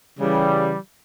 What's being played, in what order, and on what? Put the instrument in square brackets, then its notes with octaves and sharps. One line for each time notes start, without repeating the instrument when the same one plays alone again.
[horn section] C#3 E3 G3